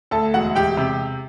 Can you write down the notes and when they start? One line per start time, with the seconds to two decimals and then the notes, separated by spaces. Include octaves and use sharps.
0.11 D2 A4 A5
0.34 E1 F#4 F#5
0.55 E1 G4 G5
0.77 C3